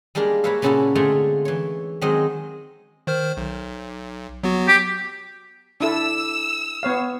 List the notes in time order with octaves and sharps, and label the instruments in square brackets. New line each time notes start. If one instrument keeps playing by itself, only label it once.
[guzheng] G3 G#3 A#3 D4 A#4
A#3 E4 B4 C#5 E5 F5
A#2 C#3 C#4 E4 F#4 A4
D3 G#3 A3 C4 F4 G#4
E3 C#5
D#3 F#3 G#3 C4 D#5
[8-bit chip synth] D#3 C5 F6
B1
F#3 B3 F#4
[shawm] G4
[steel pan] D4 E4 A4 [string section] E6
[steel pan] B3 C#5 F5